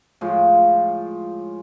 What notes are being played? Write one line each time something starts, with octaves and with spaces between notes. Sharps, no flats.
A2 F3 G#3 F4